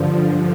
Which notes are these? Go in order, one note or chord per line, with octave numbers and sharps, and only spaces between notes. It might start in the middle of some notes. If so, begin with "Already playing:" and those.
Already playing: G2 D3 F3